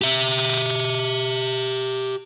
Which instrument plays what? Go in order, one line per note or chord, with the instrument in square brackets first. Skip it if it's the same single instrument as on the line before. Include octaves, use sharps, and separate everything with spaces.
[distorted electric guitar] G4 E5